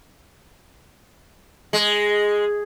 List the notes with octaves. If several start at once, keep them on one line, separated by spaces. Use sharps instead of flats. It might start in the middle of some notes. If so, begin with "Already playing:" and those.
G#3